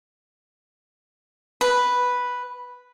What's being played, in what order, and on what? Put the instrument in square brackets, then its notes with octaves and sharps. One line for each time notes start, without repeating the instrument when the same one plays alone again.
[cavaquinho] B4